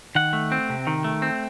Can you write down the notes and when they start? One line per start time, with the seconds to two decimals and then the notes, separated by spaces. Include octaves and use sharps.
0.15 D#3 F#5
0.33 A3
0.52 C4
0.69 C3
0.87 D#3
1.04 A3
1.22 C4